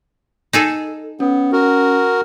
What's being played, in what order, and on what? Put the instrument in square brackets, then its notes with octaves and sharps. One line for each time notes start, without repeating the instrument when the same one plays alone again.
[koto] D#4 G#4 A4
[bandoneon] B3 [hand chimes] C#4
[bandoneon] F#4 A#4